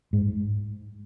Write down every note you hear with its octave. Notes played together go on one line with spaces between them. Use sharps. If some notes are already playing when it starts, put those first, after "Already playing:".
G#2